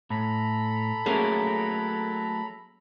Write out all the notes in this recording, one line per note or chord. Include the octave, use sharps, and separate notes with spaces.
A2 A4 A#5 B5
F#3 A3 A#3 C#4 G#4 A#4